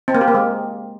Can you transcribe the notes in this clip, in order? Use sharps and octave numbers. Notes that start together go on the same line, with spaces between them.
C4
A#3
G4
A#3
G#3